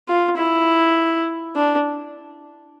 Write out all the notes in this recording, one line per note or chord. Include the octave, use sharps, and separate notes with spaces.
F4
E4
D4